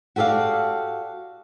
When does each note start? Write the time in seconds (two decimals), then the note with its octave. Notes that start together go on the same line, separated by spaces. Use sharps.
0.16 F#4 G4 A4 D5 F5